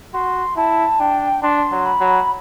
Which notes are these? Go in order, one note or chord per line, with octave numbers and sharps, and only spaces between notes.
F#4 C6
E4 A5
D4 G5
D4 C6
F#3
B5
F#3